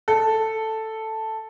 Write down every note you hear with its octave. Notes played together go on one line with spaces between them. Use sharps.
A4